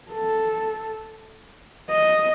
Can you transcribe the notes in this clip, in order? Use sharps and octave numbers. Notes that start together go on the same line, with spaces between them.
A4
D#5